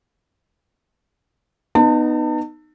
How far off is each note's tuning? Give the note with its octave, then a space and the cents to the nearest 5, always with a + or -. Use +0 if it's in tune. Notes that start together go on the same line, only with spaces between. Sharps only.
B3 +0 D#4 -20 A5 +35